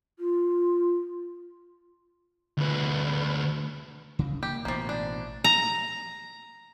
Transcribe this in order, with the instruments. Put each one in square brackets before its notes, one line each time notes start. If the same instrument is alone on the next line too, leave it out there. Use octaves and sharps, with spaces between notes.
[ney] F4
[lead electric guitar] D2 B4
[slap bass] D2 C#3
[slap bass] A#3 [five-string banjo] G4
[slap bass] A1 B2 [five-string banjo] F3 A#3
[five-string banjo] D4
[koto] A#5